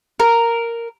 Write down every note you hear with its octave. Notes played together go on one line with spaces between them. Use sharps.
A#4